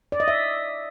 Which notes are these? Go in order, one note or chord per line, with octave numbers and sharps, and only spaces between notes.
D5
D#5
E5